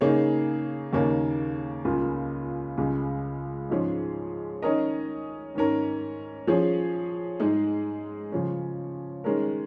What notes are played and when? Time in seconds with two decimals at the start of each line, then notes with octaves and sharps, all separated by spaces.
0.01 C#3 A#3 D#4 G#4 C#5
0.93 D#2 C#3 A#3 D#4 C#5
1.85 C#2 C#3 A#3 F4
2.78 C#2 C#3 G#3
3.69 G#2 F3 G#3 C#4 G#4
4.62 D#3 C#4 A#4 D#5
5.55 G#2 D#3 C#4 A#4
6.47 F3 C#4 G#4 C#5
7.40 G#2 G#3 D#4 G#4 D#5
8.32 C#3 F3 C#4
9.24 D#3 G#3 C#4 A#4